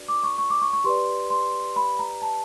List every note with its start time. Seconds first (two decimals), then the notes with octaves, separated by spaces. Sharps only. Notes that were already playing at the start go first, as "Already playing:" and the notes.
Already playing: D4 F#4 B4 D5
0.08 D6
0.24 C#6
0.38 C#6
0.50 D6
0.62 C#6
0.73 C#6
0.84 G4 B4 D5 C6
1.30 C6
1.76 B5
1.99 A#5
2.22 A5